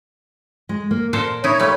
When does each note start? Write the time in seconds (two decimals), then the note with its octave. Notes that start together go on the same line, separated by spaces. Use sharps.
0.69 G#3
0.91 A#3
1.13 A#2 A4 A#4 C5
1.44 D#4 E4 C#5
1.60 F3 G3 A3